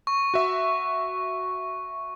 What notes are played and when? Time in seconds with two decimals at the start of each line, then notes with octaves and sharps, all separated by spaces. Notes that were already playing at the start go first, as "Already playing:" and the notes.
0.07 C#6
0.34 F#4 E5